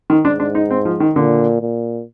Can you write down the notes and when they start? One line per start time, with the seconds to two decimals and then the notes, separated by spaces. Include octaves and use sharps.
0.10 D#3
0.24 G#2 D4
0.40 D4
0.55 D#4
0.70 C4
0.85 F3
1.00 D#3
1.15 A#2 D3
1.61 A#2